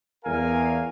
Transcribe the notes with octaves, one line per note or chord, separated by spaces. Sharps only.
E2 A#4 F5 G#5